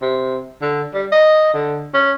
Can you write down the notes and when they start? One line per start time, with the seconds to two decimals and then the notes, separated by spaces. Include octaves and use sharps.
0.02 C3
0.61 D3
0.94 G3
1.12 D#5
1.54 D3
1.94 C#4